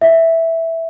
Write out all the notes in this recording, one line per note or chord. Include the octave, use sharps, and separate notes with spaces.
E5